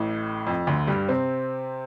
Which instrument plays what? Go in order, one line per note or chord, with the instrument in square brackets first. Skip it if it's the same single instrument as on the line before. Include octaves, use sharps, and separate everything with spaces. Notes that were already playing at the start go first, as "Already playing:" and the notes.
Already playing: [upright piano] A1 A2
F2
D2 D3
G2 G3
C3 C4